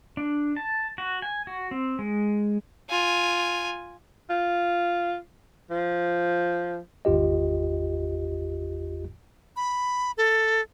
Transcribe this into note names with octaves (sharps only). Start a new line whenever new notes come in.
D4
A5
F#4
G#5
F#4
C4
G#3
F4 G#5
F4
F3
G#1 E2 F4 G4 D#5
B5
A4